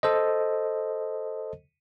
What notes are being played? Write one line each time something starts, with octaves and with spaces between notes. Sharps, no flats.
A4 C5 D#5